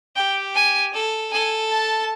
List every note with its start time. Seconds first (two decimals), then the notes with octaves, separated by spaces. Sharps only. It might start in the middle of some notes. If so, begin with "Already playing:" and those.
0.16 G4 G5
0.55 G#5
0.93 A4
1.32 A4 G#5
1.71 A5